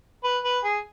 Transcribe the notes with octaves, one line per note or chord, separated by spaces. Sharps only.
B4
B4
G#4